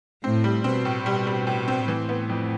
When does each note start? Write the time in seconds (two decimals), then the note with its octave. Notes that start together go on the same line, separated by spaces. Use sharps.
0.24 A2 C4
0.44 G3
0.64 B2 C4
0.85 A2
1.06 B2 G3
1.27 G3
1.47 A2
1.68 C4
1.88 A2 E3
2.09 B3
2.29 F2